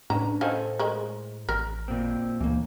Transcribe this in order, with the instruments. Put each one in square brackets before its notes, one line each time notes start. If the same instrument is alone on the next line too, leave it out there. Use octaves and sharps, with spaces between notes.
[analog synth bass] A2 [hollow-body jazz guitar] C#4 D4 B4 [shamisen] A#5
[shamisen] D#3 F5 [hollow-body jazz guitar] A4 C5 G#5
[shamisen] G#3 A#4
[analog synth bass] A1 [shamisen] A#4
[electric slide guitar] A#2 C4
[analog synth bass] D2 [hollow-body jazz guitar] E3 A#3